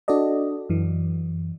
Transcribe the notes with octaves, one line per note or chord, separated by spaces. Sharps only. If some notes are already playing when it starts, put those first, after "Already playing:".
D4 F#4 A4 D5 D#5
F#2 E3